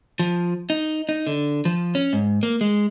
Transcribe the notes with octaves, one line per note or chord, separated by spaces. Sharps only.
F3
D#4
D#4
D3
F3
C#4
G#2
A#3
G#3